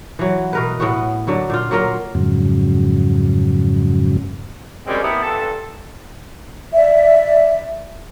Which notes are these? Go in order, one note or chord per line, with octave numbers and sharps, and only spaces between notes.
E3 F#3
B2 A#4 B4
A2 B3 F#4
D3 F#3 A#3
A#2 F4
F#3 A#3 F4 A#4
F2 G#2 C#3 F#3
F#2 G3 G#3 C4 C#4
A3 B3 E4 G4 A#4
G2 A#2 A4
D5 E5